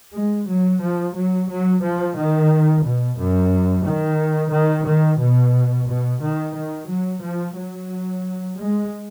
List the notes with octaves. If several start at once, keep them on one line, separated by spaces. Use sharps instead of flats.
G#3
F#3
F3
F#3
F#3
F3
D#3
B2
F#2
D#3
D#3
D#3
B2
B2
D#3
D#3
F#3
F3
F#3
G#3